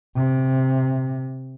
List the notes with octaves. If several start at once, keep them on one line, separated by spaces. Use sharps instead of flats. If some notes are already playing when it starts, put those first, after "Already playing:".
C3